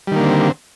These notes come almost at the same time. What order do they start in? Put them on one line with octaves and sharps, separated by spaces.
G3 D#3 A#3 D3 C4